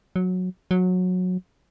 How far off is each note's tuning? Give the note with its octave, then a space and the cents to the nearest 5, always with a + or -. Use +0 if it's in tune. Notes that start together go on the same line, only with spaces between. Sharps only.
F#3 -15
F#3 -20